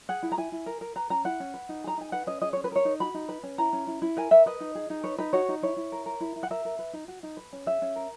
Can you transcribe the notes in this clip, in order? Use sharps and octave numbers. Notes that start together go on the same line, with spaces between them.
G#4 F#5
E4
A#5
E4 G#5
E4
A#4
A#4
B4 A#5
C#4 A#5
E4 F#5
C#4
B4
D#4
G#4 A#5
D#4 G#5
B4 F#5
C#4 D#5
G#4 D#5
C#4 C#5
B4
A#4 C#5
D#4
F#4 B5
D#4
B4
C#4
E4 A#5
C#4
E4
E4
A#4 G#5
A#4 E5
B4 D#5
D#4
G#4
D#4
B4 C#5
D#4 B4
F#4 C#5
D#4
E4 C#5
E4
A#4
A#4
E4
E4
F#5
A#4 E5
A#4
B4
D#4
F#4
D#4
B4
C#4
G#4 E5
C#4
A#4